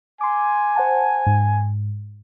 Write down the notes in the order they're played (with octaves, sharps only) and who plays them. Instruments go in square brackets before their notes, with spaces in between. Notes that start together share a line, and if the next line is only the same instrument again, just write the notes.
[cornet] G#5 [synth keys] C6 D6
[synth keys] C5 F#5 A5
G#2